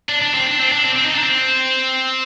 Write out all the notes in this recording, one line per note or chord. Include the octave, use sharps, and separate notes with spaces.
D4
D4
C4
D4
C4
D4
C4
C4
D#4
D4
C4